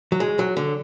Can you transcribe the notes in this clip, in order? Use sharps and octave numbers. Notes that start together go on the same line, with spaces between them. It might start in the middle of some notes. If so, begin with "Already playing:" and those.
F#3
G#3
F#3
D3